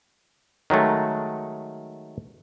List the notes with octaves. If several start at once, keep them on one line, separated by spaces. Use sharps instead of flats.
D#3 F#3 G#3 A3